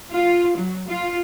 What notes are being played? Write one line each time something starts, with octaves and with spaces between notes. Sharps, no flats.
F4
F#3
F4